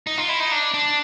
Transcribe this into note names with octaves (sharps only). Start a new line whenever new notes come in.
D#4
F4
E4
D#4
D4
D4